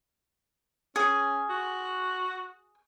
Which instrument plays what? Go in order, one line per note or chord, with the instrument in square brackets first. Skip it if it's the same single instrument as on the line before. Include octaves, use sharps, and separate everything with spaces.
[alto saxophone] C#4 [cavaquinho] G#4
[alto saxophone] F#4